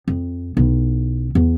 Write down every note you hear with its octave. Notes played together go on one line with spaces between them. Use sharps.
F2
B1 E4
E2